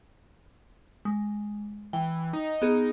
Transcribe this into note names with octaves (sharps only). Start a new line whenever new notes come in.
G#3
E3 G5
D#4
B3 G#4